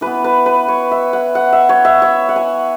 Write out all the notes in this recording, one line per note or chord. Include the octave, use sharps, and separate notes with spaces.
E3 B3 B4
B4
B4
C#5
E5
F#5
F#5
E5
C#5
E5
C#5
F#5
G#5